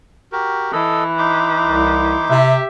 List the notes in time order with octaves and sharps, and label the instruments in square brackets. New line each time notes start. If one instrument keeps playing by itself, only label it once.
[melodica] F#4 G4 A#4
[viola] E3 [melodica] A4 D#5
[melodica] D#4 C6 D6
[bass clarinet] C2
[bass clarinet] C3 [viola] G4 E5